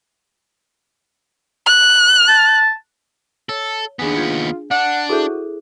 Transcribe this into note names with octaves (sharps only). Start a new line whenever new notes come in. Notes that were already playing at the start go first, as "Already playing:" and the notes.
F#6
A5
A4 C#5
D#2 B3 D4 G#4 G#5
F4 G6 G#6
D4 F#5
E4 F#4 G#4 A4 C5 E5 G6